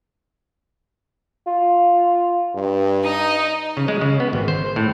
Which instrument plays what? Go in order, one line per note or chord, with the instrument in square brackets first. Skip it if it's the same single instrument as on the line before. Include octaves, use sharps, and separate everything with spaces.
[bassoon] F4
[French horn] G2
[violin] D#4 D#5
[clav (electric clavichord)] C#3
G#3
C#3
B3
G#1
C5
A2